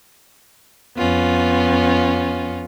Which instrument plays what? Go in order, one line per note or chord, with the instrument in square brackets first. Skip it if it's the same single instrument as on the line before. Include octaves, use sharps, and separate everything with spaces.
[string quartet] F2 B3 C#4 F4